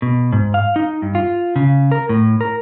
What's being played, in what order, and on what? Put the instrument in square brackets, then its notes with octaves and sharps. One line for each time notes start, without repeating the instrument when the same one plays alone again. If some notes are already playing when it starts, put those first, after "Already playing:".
[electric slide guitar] B2
G#2
F5
D#4
G2
F4
C#3
A#4
A2
A#4